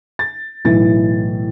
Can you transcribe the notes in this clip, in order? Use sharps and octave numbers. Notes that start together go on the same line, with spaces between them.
A6
B1 A2 E3 A6